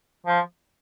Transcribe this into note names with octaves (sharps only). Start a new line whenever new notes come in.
F3